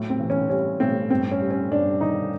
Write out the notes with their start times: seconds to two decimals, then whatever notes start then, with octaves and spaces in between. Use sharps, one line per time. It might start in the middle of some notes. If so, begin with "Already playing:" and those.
Already playing: A2 F#3
0.10 C4
0.20 E3
0.30 C#4
0.50 G3 C#4
0.80 A2 C4
1.10 G2 C4
1.32 C#4
1.41 G3
1.51 C#4
1.71 G2 D4
2.01 D#3 D#4